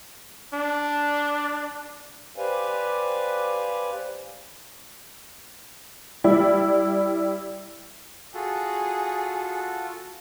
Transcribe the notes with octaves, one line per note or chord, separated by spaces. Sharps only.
D4
G4 B4 C5 D5 F5 G#5
G3 E4
F4 F#4 G#4 A4